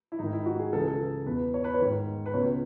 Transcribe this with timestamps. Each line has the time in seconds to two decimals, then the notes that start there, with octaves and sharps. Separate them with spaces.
0.12 E4
0.19 G#2 D#3 D#4
0.33 E4
0.46 F#4
0.59 G#4
0.72 C#2 C#3 E3 A4
0.80 G#4
0.88 A4
1.26 E2 B2 B4
1.54 C#5
1.64 B4
1.74 C#5
1.80 G#2 D#3
2.26 B4
2.33 C#2 B2 C#5